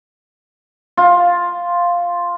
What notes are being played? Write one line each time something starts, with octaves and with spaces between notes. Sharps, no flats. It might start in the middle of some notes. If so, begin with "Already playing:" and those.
F4